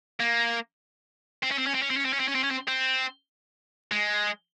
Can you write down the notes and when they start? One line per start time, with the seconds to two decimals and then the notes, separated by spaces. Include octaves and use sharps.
0.20 A#3
1.43 C4
1.52 C#4
1.59 C4
1.67 C#4
1.74 C4
1.82 C#4
1.90 C4
1.97 C#4
2.05 C4
2.13 C#4
2.20 C4
2.28 C#4
2.35 C4
2.44 C#4
2.51 C4
2.68 C4
3.92 G#3